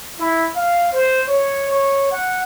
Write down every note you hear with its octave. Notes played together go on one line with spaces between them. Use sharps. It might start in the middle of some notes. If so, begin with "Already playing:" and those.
E4
F5
C5
C#5
C#5
F#5